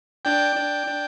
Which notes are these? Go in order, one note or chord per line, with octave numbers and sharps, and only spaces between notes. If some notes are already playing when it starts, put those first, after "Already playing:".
D4 G5
D4
D4